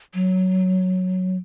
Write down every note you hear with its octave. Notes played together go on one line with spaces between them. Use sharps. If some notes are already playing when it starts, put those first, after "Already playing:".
F#3